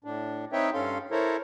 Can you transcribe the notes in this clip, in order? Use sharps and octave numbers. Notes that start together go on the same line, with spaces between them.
A2 D4
C4 D#4 B4 C#5 E5 G5
G2 C#4 A4 F5 C6
E4 A4 A#4 C5 C#5